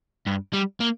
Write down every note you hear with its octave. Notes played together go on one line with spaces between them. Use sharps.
G2
G3
A#3